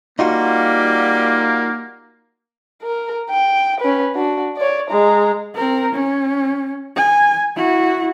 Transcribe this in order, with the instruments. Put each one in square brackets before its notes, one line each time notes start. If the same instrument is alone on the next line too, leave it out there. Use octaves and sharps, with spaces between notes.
[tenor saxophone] G3 [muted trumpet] A#3 [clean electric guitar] D#4 F4 F#4
[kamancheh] A#4
G5
C#4 B4
D4 F#4
C#5 D5
G#3 A#5
[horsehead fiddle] C4 A#4
C#4
G#5
E4 F#4